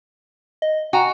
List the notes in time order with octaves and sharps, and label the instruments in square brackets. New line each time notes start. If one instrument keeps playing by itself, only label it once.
[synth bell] D#5
[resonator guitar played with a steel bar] F#4 [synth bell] G5 G#5 A#5